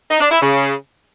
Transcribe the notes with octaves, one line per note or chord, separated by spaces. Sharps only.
D#4
D4
E4
C#3